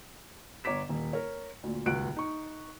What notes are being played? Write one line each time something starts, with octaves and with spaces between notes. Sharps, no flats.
G1 C#5 A#5 D6 B6 E7
D#1
A#4 C#5
D2 A#2
D#1 C#2 F#4 F#6 D7
D#4 C#6